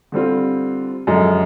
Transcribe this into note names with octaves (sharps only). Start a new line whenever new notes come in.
D3 G3 C4 F4
F#2 D3 F3 G#3